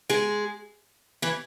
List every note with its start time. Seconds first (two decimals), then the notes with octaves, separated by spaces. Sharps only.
0.10 G#3 G#4
1.22 E3 E4